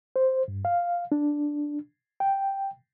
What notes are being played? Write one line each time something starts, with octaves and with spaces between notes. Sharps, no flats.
C5
G2
F5
D4
G5